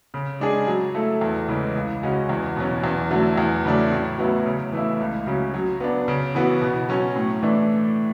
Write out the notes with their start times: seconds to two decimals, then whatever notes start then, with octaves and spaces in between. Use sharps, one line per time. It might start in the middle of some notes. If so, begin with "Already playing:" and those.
0.14 C#3
0.40 G#3 D4 G#4
0.67 F#3
0.95 A3 E4 A4
1.21 E2
1.48 C#3 E3 G#3
1.76 C#2
2.03 C#3 G#3 C#4 F#4
2.29 E2
2.56 B2 F#3 C#4
2.84 E2
3.11 D3 F#3 A3
3.38 E2
3.64 C#3 F#3 A3 D4
3.91 A2
4.18 F#3 B3 E4
4.46 C#3
4.72 E3 A3 E4
5.00 C#2
5.26 C#3 F#3 C#4
5.54 F#3
5.80 B3 D4
6.08 C#3
6.35 E3 B3 F#4
6.61 B2
6.89 F#3 C#4
7.16 A2
7.43 E3 A3 D4